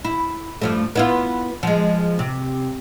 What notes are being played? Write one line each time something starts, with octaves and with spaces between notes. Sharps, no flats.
E4
G2 F3 A3
B3 E4 F4
F3 G#3
C3